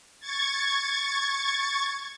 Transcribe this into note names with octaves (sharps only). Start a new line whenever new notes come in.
C#6 G#6 A6